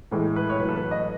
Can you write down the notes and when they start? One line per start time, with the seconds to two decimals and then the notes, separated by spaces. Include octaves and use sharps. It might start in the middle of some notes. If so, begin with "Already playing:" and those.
0.11 A2 E3 G#3
0.36 B4
0.50 C#5
0.59 A2 F#3 B4
0.69 A4
0.76 B4
0.91 D#5